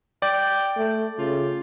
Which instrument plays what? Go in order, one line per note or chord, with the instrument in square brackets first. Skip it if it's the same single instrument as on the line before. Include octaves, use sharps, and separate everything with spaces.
[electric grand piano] D5 [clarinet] G5
[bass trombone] A3
[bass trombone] C#3 [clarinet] F4